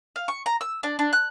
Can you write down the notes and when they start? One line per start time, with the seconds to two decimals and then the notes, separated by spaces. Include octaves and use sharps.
0.16 F5
0.28 C#6
0.46 A#5
0.61 E6
0.83 D4
0.99 D4
1.13 F#6